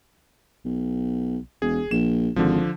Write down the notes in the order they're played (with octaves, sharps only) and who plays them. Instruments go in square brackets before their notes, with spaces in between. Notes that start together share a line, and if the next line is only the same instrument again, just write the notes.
[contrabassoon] B1
[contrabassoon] E1 [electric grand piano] G#4
[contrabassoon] A#1 [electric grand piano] E7
[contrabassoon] G#1 [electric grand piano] D3 F3